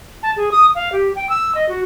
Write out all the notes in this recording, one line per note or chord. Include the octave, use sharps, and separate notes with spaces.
A5
G#4
D#6
F5
G4
G5
E6
D#5
F#4